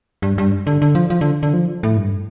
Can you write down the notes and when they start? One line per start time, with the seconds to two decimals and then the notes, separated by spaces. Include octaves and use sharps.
0.22 G2
0.38 G2
0.67 D3
0.82 D3
0.95 F3
1.10 F3
1.21 D3
1.43 D3
1.53 F3
1.83 A2
1.97 G2